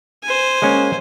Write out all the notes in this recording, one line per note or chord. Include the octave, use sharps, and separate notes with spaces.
C5 G#5
G#3 A#3 C#4